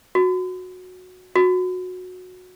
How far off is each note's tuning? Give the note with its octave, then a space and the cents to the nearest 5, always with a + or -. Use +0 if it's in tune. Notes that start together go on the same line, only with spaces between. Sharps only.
F#4 -15
F#4 -20